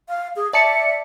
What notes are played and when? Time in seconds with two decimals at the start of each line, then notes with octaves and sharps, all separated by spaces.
0.08 F5
0.36 G#4
0.53 D5 E5 A5 C#7